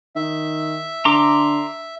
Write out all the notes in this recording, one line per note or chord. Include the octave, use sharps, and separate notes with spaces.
D#3 E5
D3 A#5 C6 D6